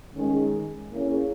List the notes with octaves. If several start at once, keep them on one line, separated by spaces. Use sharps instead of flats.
D#3 G#3 C#4 G#4
A#3 C#4 E4 G#4 C#5